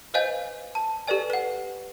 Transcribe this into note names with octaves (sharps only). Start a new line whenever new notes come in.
B4 C5 D#5 F5 G#5 G6
A5
G4 A4 B4 D5 G#5
B4 F#5